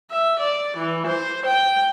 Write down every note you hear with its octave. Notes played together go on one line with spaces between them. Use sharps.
E5
D5
E3
C5
G5